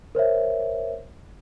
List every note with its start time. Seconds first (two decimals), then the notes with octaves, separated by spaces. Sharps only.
0.15 A#4 C5 C#5 E5